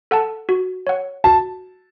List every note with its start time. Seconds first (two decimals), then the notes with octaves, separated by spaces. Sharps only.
0.11 A4 F#5 A5
0.49 F#4
0.87 C#5 F#5
1.24 F#4 A5